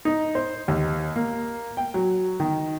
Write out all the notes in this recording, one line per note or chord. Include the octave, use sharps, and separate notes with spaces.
D#4
C5
D#2
A#3
G5
F#3
D#3